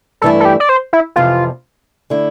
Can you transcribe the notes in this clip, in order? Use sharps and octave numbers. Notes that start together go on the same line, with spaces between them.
G2 E3 A3 E4 A4
A4
G4
D5
C5
E4
F2 C3 E3 F4
D3 A3 E4